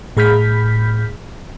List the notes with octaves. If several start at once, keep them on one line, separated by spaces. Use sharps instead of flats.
A2 G#4 B5 F6 G6 B6